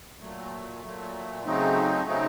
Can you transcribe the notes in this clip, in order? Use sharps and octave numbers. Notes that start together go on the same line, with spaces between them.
A#2 F#3 A3
A#2 F#3 A3
C#3 F#3 A3 C4 D#4
C#3 F#3 A3 C4 D#4